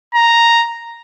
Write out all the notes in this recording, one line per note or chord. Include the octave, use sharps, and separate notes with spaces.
A#5